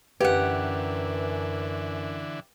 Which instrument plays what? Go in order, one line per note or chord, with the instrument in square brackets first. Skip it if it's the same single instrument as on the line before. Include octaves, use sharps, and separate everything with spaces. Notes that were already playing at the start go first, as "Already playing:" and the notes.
[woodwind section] F#2 [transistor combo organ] D3 E3 [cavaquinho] G4 F#5 [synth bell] B4